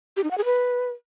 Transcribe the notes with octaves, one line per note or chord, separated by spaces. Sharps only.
G4
D#4
F#5
G#4
B4